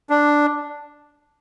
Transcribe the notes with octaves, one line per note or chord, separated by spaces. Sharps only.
D4